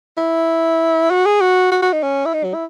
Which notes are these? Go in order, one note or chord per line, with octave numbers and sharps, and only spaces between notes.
E4
F#4
G#4
F#4
F#4
F#4
D#4
C#4
E4
D#4
F#3
E4